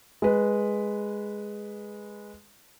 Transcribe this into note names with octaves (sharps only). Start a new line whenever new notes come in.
G#3 B4